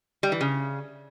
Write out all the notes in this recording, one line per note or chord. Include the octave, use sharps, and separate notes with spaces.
G3
E3
C#3